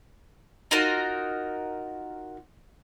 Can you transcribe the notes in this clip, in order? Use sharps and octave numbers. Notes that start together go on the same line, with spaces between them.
D#4 F4 F#4 A#4